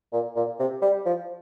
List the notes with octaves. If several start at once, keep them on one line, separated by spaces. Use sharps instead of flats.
A#2
A#2
C3
G3
F3